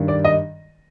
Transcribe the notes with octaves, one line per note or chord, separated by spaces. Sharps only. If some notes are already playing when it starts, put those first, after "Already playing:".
Already playing: G2 D#3 G3
D5
D#5